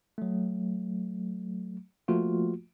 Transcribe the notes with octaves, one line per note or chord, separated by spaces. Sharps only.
F#3 A3
F3 A3 A#3 F4 F#4